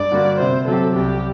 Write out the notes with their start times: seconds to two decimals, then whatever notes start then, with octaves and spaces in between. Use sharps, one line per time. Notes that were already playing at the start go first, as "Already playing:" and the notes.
Already playing: G2 D5
0.12 D3 G3 A#3 F#4
0.39 C3 C5
0.68 F#3 C4 G4 A4
0.95 C2 G4